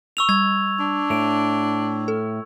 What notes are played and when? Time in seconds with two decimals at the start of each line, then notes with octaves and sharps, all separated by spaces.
0.17 C#6 E6 F7
0.29 G3 G#6
0.79 D4
1.10 A2 D7 F7
2.08 A4